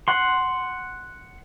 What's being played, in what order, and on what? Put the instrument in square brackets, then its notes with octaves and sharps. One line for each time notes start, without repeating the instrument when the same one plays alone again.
[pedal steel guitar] F#5 C6